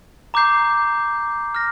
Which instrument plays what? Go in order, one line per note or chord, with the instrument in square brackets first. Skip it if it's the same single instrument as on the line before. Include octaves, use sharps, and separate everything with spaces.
[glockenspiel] A#5 D6 G6 C7
F6 A#6